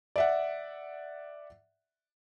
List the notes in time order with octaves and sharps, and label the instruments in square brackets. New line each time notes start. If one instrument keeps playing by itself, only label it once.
[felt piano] D5 E5 F#5